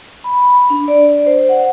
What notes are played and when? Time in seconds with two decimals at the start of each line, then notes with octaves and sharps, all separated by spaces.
0.24 B5
0.70 D4
0.88 D5
1.12 D5
1.26 C5
1.49 F#5